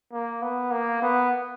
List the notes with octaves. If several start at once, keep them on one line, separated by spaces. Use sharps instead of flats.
A#3
B3
A#3
B3